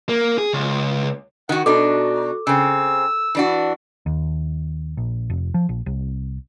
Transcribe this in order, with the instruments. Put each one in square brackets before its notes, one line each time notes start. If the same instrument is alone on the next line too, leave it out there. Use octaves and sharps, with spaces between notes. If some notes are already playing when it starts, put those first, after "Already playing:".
[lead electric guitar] A#3
G#4
C#2
[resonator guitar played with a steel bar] D#3 F#4 [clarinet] F#5
[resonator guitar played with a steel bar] B2 D4 D#4 [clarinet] F#4 [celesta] A4 D6
[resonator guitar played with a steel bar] C#3 C4 [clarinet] E6
[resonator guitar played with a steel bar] E3 D4 F#4
[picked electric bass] D#2
A#1
F1
F3
A#1
C2